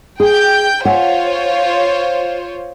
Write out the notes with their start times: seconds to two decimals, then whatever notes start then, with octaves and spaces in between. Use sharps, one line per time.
0.20 G#4 G5 G6
0.85 F4 C5 C#5 E5 F#5 G#5